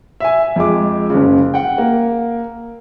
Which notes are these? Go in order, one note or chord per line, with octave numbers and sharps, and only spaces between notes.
E5 G#5
F2 G#3 D6
F#1 C#3
F#5 G5
A#3